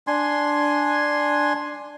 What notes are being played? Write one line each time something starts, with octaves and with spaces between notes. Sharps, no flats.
D4 G#5 C6